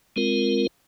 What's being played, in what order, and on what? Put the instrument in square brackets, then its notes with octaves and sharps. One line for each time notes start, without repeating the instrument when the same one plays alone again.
[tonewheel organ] G#3 C4 F4 A#4